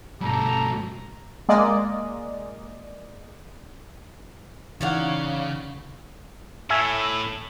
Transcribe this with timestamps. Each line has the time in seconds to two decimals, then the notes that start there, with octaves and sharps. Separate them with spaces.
0.21 G2 B2 G4 A4 A#5
1.49 G#3 A#3 D5 D#5
4.81 C#3 E3 D#4 C#5 D5 F5 F#5
6.70 A2 E5 G#5